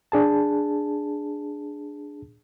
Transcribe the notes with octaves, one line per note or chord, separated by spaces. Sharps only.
D4 G#4 A5